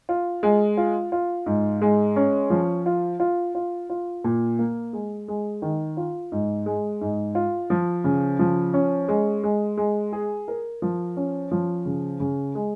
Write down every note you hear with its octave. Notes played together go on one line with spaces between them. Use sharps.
F4
G#3
F4
F4
G#2
G#3
C#4
F3
F4
F4
F4
F4
A#2
A#3
G#3
G#3
D#3
F4
G#2
G#3
G#2
F4
F3
C#3
F3
C#4
G#3
G#3
G#3
G#4
A#4
F3
C#4
F3
C#3
C#3
G#3